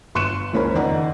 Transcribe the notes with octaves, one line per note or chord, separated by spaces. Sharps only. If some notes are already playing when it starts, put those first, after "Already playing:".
G1 C6 C#6 F#6 C#7 E7
F#1 C#2 C#4 A#4 C5 B5
F#1 F2 D#3 D5 F#5 A#5